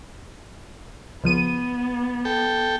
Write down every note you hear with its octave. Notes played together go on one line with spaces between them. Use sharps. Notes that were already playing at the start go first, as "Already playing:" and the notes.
C#2 F3 B3 D#7
A4 G5